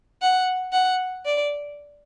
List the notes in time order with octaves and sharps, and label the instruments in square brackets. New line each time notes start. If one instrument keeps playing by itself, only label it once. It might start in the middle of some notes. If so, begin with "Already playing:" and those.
[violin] F#5
F#5
D5